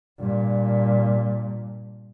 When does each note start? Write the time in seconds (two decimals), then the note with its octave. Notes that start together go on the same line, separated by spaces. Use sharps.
0.20 G2 A#2